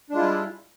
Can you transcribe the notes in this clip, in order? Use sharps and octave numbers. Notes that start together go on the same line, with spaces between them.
G3 G#3 D4 E4 F4